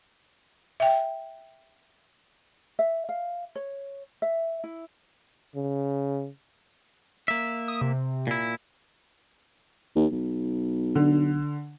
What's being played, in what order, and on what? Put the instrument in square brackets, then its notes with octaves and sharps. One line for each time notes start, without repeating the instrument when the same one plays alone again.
[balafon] E5 G5
[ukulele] E5
F5
C#5
E5
E4
[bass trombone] C#3
[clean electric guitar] A#3 E5
[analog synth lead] D#6
C3
[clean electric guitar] A#2 E4
[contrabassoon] D#2
B1
[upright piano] D3